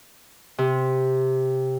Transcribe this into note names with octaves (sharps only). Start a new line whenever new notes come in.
C3